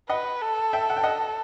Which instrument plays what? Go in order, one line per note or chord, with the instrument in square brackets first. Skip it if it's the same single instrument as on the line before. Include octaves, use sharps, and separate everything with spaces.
[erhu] B4 [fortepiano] D#5 F#5
[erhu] A4
[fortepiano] E5 G5
F#5
G5
D#5 F#5